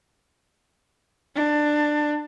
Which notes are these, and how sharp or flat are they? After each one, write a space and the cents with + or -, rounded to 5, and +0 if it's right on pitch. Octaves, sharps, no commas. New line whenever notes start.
D4 +20